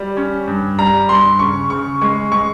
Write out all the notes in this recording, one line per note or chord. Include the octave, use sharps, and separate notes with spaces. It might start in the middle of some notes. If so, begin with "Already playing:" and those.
Already playing: G3
C#4
G2
G3 A#5
G2 C6
C#3 C#6
C#3 C#6
G#3 C#6
G#3 C#6